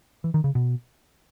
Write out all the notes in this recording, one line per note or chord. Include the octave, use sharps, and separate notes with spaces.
E3
D#3
C#3
B2